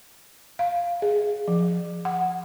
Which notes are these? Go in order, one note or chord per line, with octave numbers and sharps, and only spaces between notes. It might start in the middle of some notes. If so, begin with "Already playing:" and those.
F5
G#4
F3
F#5